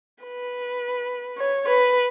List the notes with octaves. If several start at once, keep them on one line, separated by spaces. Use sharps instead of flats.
B4
C#5
B4